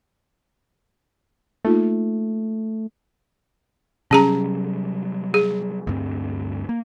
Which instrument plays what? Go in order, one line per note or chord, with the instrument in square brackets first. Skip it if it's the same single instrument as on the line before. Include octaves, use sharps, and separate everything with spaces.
[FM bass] A3 [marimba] A#3 D#4 F4
[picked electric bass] C3 F#3 G3 [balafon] C#4 G#4 A#5
[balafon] G#4
[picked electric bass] D2 G2 C4
A#3